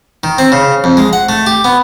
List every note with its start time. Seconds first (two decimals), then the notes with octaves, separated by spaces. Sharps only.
0.24 D#3
0.38 C4
0.52 C#3
0.84 F2
0.97 G#3
1.13 F#5
1.29 A3
1.47 G4
1.64 B3